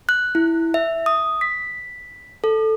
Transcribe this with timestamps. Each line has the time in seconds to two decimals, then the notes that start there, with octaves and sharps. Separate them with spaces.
0.09 F#6
0.35 E4
0.74 E5
1.06 D#6
1.41 B6
2.44 A4